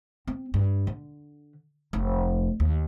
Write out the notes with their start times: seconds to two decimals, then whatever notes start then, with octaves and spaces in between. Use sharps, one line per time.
0.27 C4
0.54 G2
0.87 D3
1.93 F1
2.60 D#2